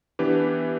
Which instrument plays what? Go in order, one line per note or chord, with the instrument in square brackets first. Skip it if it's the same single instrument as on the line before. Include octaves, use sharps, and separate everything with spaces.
[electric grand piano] E3 B3 D4 G4 B4